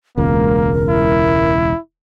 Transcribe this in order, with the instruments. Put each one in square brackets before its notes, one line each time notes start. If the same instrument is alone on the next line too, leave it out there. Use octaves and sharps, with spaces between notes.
[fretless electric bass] E1 C#2 [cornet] A#3 [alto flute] A#4
[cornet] E4